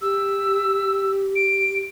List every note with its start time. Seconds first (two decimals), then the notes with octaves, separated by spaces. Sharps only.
0.02 G4 E6
1.36 D7